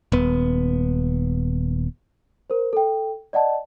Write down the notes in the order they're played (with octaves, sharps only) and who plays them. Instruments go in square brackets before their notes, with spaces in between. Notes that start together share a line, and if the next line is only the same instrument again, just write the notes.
[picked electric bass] D#1 B3
[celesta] A#4 C5
A4 G5
D5 D#5 F#5 A5